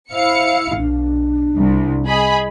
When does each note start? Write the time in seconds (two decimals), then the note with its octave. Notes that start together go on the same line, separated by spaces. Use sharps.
0.11 E4 C5 F5 C#7
0.77 B1 D4
1.56 C2
2.08 G#4 D#5 B5